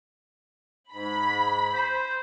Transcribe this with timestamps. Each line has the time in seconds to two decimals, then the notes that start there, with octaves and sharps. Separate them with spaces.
0.92 G#2 B5
1.73 C5